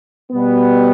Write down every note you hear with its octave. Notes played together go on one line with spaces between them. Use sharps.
B2 G3 B3